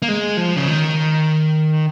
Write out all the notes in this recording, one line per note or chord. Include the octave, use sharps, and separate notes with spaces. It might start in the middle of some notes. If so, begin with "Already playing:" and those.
A#3
G#3
F3
C#3
D#3